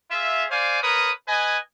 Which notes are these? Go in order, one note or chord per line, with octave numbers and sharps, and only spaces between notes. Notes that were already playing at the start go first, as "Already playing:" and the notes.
F4 G#4 E5
C5 D5 F5 G#5
A#4 B4 C#5 D#6
B4 D#5 G#5